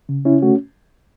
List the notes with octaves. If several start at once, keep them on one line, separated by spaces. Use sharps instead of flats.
C#3
C#4 E4
A3 F#4